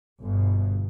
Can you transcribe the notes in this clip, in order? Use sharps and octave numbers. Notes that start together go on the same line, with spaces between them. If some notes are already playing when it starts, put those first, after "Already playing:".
G1 B2